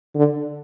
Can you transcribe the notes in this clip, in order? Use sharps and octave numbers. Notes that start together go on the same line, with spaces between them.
D3